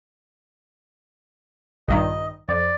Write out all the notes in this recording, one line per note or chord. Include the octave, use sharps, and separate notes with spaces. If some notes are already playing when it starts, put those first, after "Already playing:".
A#1 G2 D#3 D#5
F2 D5